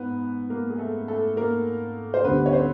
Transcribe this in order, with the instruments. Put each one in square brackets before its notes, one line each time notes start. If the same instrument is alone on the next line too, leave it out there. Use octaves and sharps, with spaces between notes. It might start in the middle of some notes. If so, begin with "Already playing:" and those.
Already playing: [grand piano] G#2 B3 B4
A#3 A#4
G#4
A3 A4
A3 A4
A#3 A#4
C5
D2 D3 G3 B3 B4
C#5
C4 C5